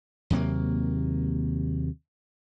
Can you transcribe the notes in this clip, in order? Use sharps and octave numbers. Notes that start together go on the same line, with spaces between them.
D#2 C3 F#3 A#3